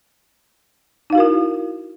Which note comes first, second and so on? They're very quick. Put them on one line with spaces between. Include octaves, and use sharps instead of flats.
D#4 F5 F#4 A#4 E4